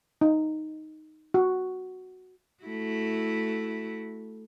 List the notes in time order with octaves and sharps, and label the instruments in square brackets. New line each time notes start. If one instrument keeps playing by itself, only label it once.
[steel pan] D#4
F#4
[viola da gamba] A3 E4 F#4